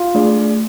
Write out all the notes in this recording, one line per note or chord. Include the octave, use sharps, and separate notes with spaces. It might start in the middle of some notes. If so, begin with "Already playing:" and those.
Already playing: F4
A3 D4 G#4 D5